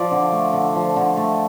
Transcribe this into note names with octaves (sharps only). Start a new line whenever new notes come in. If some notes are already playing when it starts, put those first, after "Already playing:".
Already playing: F3 D5
D3
A3
D3
F3
D3
A3